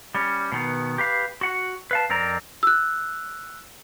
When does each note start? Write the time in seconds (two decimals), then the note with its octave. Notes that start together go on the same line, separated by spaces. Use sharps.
0.15 G3 C#4
0.52 B2 D#3 B3
0.98 G4 B4 F5
1.41 F#4 F#5
1.91 B4 F5 A5
2.09 F2 C4 A#4 D5 A#5
2.63 E6 F#6